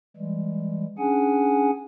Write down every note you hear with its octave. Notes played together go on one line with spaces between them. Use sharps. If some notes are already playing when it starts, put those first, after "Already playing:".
E3 G3 G#3
C#4 D4 G#4 F#5 G#5